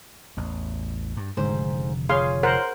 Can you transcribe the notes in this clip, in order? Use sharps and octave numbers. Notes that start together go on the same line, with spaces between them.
A1 E2
G2
F1 G#2 D3 D#3 C5
F4 G#4 C#5 F5 C6
A#4 C5 F#5